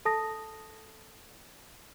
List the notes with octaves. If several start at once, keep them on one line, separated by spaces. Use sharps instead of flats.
A4 A5 D#6 A#6